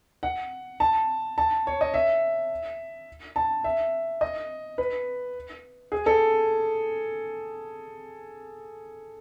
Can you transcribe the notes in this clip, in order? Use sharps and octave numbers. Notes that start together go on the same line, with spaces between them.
F#5
A5
A5
C#5
D#5
E5
A5
E5
D#5
B4
G#4
A4